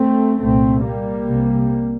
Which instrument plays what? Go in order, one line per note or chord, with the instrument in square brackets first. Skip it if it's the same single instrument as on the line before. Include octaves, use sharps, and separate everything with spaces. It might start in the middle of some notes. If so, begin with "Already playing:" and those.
Already playing: [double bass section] A3 C4
C2 A#2 A3 C4
G3 A#3
C2 C3